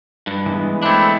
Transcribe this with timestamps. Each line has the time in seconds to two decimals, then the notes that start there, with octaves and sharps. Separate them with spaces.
0.27 G2
0.46 E3 G#3 B3
0.82 A3 C4 D4 E4